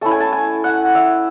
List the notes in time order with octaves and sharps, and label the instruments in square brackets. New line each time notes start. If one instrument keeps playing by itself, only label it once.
[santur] A3 C#4 E4 A5
G#5
A5
G#5
F#5
E5